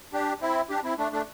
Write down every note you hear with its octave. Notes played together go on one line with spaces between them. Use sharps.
D4 G4
C4 E4
D4 G4
C4 E4
A3 D4
A3 D4